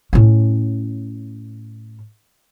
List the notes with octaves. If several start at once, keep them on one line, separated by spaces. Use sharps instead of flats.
A2 C#4